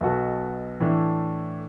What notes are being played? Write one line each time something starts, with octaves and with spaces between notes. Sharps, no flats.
B1 B2 B3 F#4 A4
A2 E3 A3 D4